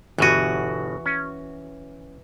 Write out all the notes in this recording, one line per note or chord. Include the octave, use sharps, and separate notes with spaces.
G1 B2 E3 F#4 G#5
C#4